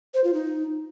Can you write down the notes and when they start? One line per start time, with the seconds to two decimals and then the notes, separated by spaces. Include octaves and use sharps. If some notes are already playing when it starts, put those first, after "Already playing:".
0.14 C5
0.24 F4
0.34 D#4